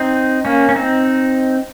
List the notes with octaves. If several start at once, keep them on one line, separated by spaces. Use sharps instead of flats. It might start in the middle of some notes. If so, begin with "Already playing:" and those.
Already playing: C4 D#4
A#3 C#4
C#4
C4 D#4